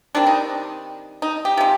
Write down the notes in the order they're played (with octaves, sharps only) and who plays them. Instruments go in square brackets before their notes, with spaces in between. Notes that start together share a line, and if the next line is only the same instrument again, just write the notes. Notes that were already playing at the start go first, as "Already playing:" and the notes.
[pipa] D#3 G3 C4 D4
D#4
D#4
G4
C3 F3 G#3